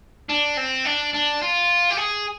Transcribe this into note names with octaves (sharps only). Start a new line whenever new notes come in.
D4
C4
D4
D4
F4
G4
G#4